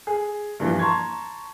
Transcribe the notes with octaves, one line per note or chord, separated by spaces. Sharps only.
G#4
G2 A#2 E3 F3
A5 A#5 C6 C#6 G#6